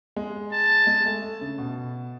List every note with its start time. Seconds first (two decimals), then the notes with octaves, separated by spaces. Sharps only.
0.16 G#3
0.52 A5
0.87 G#3
1.06 A3
1.23 A3
1.41 C#3
1.58 B2